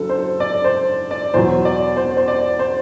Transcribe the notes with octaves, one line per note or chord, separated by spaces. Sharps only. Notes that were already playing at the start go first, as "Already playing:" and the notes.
Already playing: F#1 D3 F#3 A4
C5
D5
C5
D5
E2 B2 F#3 C5
D5
C5
C5
D5
C5